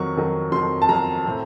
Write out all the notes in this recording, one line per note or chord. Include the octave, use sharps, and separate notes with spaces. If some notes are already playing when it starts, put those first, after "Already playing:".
Already playing: F2 D#3 F#3 C#6
F2 D#3 F#3
F2 D#3 F#3 C6
A5
F2 D#3 F#3 A#5
A2 A3 C4